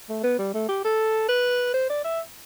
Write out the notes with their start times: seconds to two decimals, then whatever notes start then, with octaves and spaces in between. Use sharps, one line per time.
0.09 A3
0.23 B3
0.39 G3
0.54 A3
0.69 G4
0.84 A4
1.29 B4
1.74 C5
1.90 D5
2.04 E5